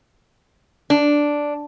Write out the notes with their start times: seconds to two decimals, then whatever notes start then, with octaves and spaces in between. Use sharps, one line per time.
0.90 D4